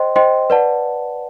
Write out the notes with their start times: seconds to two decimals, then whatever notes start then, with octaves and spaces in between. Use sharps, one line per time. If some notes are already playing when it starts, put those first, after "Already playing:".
Already playing: C5 D#5 G5 C6
0.16 C5 D#5 G5 C6
0.50 B4 D5 F#5 A5